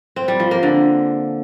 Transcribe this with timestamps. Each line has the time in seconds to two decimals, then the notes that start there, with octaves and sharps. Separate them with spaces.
0.16 C4
0.28 G3
0.40 F3
0.51 A#3
0.63 D3